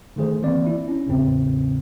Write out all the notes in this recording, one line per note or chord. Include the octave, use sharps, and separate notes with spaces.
D3 D#3 A3 G#4 C5
E3 A#3 C4 D5
E4
C#4 D4
A1 E2 A2 C#3 C4